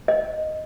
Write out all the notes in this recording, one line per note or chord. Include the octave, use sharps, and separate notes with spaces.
D#5